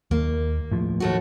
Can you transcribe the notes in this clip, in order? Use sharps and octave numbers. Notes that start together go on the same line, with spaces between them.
D#2 A#3
A2 F3
D#2 A3 F#4